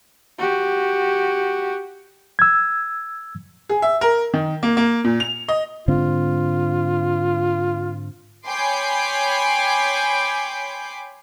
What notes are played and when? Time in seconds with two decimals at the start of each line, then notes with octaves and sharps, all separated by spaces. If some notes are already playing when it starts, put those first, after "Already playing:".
0.39 F#4 G4
2.39 E6 G#6
3.69 G#4
3.82 E5
4.01 A#4
4.34 D#3
4.63 A#3
4.77 A#3
5.04 A#2
5.20 F7
5.48 D#5
5.88 G#2 D3 C4 F4
8.46 C#5 G5 G#5 B5 C6 D6